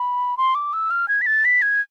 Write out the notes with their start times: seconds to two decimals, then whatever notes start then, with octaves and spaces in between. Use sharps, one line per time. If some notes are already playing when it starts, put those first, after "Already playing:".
Already playing: B5
0.37 C6
0.55 D6
0.73 E6
0.91 F6
1.08 G#6
1.22 B6
1.26 A6
1.45 B6
1.62 G#6